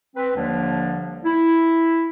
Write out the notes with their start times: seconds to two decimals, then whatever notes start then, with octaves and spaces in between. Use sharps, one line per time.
0.16 C4 B4
0.36 D#2 D3 F3 G3 A#3 D4
1.25 E4